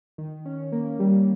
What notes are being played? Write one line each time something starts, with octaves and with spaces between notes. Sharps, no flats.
D#3
C#4
A#3
G3